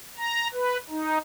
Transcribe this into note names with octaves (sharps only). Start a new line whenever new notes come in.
A#5
B4
D#4